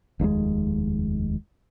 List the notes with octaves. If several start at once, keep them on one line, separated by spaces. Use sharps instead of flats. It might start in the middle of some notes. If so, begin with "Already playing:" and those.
F1 D#2 B2 G#3